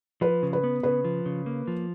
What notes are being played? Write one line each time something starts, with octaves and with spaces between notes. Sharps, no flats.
F3 B4
C#3
B4
B3
C#3 B4
F3
C#3
A#3
F3